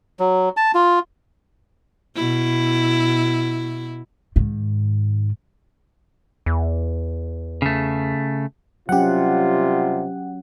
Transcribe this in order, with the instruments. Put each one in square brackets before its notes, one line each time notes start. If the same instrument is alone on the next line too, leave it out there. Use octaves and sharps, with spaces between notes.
[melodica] F#3
A5
F4
[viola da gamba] B2 E4
[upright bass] G#2 D#3
[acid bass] E2
[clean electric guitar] C#3 A3
[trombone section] C3 G3 F4 [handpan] F#3 C#4 [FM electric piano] G4 F#5